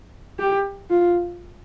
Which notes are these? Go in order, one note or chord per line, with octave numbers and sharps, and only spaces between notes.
G4
F4